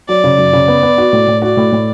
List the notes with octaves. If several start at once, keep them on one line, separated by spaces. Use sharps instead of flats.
F#3 D5
C#3
F#2
C#3
B3
B3
F#4
A2
A2
F#4 D5
A2
A2